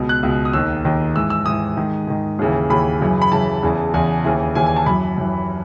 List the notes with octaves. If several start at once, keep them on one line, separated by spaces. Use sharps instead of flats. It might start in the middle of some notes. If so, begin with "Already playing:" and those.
Already playing: C#2 B2
F#6
C#2 B2
D#6
D#2 D#3 E6
D#2 D#3
G#2 E3 E6
E6
G#2 E3 D#6
G#2 D#3
G#2 D#3
D#2 C#3 E3
D#2 C#3 E3 B5
F#2 C#3 E3
B5
F#2 C#3 E3 A5
E2 C#3 E3
E2 C#3 E3 G#5
D#2 C#3 E3
D#2 C#3 E3 G#5
G#5
A5
F#2 E3 B5
F#2 E3